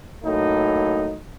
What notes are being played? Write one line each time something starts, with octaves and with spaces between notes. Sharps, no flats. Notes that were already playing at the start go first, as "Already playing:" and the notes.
A2 F#3 A#3 D#4